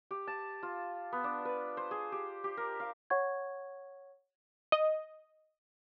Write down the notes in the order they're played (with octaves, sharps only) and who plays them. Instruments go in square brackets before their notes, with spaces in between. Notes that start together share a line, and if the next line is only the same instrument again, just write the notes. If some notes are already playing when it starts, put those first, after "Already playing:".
[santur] G4
A5
F4
B3
D4
B4
C5
G#4
G4
G4
A#4
F5
[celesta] C#5 F#5 C#6 G#6
[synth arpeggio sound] D#5